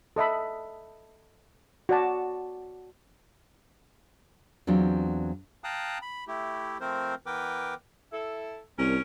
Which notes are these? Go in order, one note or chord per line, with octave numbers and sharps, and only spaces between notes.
A4 D#5 E5 B5
F#4 D5 A5
E2 F#3 C4 D4 F4
F5 G5 A5 A#5 D#6 F#6
B5
A3 E4 G4
F3 A3 C4 A#4 C5
E3 B3 A#4 B4 G5 D6
E4 A4
C2 C#4 A#4